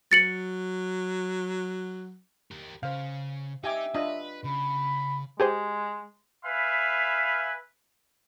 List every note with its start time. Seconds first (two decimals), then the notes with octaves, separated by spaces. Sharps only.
0.12 F#3 A6 C#7 F#7
2.51 G4 A#4
2.83 C#3 C5 F5
3.64 D#4 G4 E5 G#5 D6
3.95 D4 F4 B4 D#5
4.44 C#3 B5
5.40 G#3 G4 G#4 C5
6.44 B4 E5 F5 G#5 B5